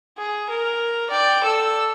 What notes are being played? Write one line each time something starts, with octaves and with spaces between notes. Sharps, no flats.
G#4
A#4
D5 G5
A4 E6